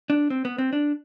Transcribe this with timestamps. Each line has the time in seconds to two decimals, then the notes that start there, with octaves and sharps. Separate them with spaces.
0.10 D4
0.30 C4
0.45 B3
0.58 C4
0.73 D4